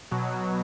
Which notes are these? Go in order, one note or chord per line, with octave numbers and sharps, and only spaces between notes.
B2 F#3